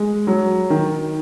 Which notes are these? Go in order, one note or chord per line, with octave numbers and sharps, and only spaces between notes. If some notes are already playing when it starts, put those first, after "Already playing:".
Already playing: G#3
F#3
D#3